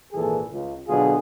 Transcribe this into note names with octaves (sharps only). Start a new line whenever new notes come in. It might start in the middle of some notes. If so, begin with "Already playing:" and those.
G#1 A#2 E3 G#4 A4
C#2
B2 D3 F#3 F4 G#4